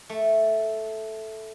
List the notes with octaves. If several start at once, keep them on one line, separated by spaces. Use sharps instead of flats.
A3